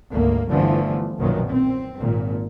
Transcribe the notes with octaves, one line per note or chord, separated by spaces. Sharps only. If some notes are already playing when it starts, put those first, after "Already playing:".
G#1 D2 A#3
G1 G2 D3 E3 F3 A3
B1 F#2 A#2 D#3 F3 F#3
C4
G#1 A#2